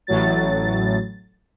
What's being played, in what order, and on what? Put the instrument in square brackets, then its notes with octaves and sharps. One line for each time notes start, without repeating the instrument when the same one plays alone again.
[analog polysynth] A1 A2 F#3 A6